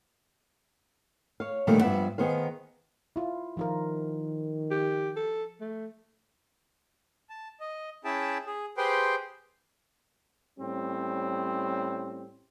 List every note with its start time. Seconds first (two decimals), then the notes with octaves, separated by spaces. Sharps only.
1.40 C#5 F5
1.67 A#2 D3 D#3 F3 G3 A3
1.81 G2 F3 B3 E5 F#5
2.18 D#3 B3 G#4 C5 F5
3.16 E4 F4
3.57 D#3 F3 F4 A#4
4.71 G4
5.16 A4
5.60 A3
7.29 A5
7.60 D#5
8.05 C#4 E4 G#4 E5 G5 A5
8.46 G#4
8.77 G4 G#4 B4 C5 G5 C6
10.58 A2 G3 C4 C#4